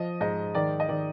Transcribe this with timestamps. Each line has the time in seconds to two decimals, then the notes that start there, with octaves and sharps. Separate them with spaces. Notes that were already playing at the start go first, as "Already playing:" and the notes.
Already playing: F3 D#5
0.21 G#2 D#5
0.55 D#3 D5
0.80 D#5
0.89 D#3 D5